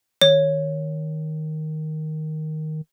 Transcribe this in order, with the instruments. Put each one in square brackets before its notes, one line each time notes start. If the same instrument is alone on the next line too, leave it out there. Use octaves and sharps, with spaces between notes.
[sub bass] D#3 [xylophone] C#5